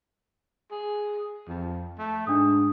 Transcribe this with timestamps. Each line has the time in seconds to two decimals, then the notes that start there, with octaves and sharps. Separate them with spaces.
0.72 G#4
1.48 F2
1.99 A3
2.27 G#2 D4 D#6